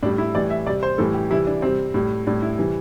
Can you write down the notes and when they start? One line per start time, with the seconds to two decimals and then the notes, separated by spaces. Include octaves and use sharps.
0.03 A2 D4
0.05 G3
0.18 E4
0.35 A2 E3 G3 D5
0.50 E5
0.66 C3 G3 D5
0.83 C5
0.98 A2 E3 G3 A4
1.14 G4
1.30 C3 E3 G3 E4
1.47 D4
1.62 C3 G3 C4
1.94 A2 G3
2.26 A2 G3 D4
2.42 E4
2.58 C3 E3 G3